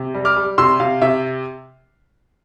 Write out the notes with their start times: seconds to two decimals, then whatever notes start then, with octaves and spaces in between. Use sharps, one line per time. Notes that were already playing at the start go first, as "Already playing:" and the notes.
Already playing: C3
0.14 G3
0.25 D6 F6
0.36 G3
0.58 C3 C6 E6
0.80 C3 F5
1.02 C3 E5